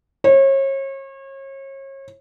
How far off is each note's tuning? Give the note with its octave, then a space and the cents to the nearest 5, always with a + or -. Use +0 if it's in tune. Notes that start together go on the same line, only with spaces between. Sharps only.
C#5 -35